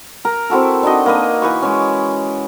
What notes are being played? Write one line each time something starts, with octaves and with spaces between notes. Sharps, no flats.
A#4 A#5
C4 E4 F#4 A4
D4 D#4 F#4 D#5
A#3 B4 D#5
E3 B4 C#6
G#3 C#4